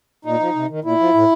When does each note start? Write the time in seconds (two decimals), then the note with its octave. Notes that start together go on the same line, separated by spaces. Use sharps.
0.25 A#2 D#4
0.40 F3
0.55 C3
0.70 D#3
0.84 A#2 E4
1.00 F3
1.14 A2